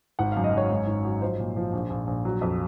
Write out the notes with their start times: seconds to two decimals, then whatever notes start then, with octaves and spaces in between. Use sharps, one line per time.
0.19 G#1 F#5
0.32 F5
0.36 F#2
0.44 D#5
0.53 F#2 C#5
0.71 G#2
0.87 G#1
1.05 F#3
1.21 F3 C5
1.39 A#2
1.56 F3
1.73 A#1
1.90 A#1
2.07 A#1
2.25 F#3
2.41 F2